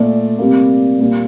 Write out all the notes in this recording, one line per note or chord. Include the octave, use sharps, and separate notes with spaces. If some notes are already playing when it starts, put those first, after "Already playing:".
Already playing: A#2 A3 D5
C3 G3 A#3
A#2 G3 A#3